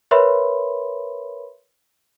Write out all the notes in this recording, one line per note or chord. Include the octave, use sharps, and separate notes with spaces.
A#4 B4 C#5 E5 B5 C6